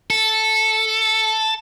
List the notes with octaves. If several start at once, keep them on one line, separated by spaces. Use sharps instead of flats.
A4